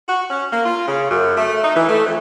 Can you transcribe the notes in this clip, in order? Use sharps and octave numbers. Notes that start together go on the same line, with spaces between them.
F#4
C#4
A#3
F4
C#3
F#2
A3
D#4
E3
A3
F2